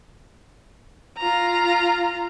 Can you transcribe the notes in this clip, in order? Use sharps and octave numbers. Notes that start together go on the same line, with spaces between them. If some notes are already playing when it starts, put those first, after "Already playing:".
F4 A#5